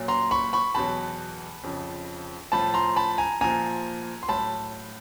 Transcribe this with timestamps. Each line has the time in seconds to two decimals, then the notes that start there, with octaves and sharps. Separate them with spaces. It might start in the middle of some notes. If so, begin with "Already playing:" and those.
Already playing: A#2 F#3
0.08 A#5 C6
0.31 B5 C#6
0.53 B5 C#6
0.75 E2 B2 F#3 A5 B5
1.64 F2 C#3 F3
2.52 A2 F3 A5 B5
2.74 A#5 C6
2.96 A5 B5
3.18 G#5 A#5
3.41 A#2 F3 G#5 A#5
4.23 C6
4.28 A2 F#3 A5 B5